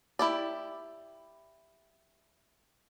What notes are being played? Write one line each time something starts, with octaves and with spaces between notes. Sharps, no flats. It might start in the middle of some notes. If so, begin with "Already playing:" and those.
E4 G4 D5